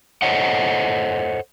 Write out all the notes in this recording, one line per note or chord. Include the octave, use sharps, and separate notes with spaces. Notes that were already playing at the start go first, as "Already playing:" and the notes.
A4 C5 C#5 D#5 F#5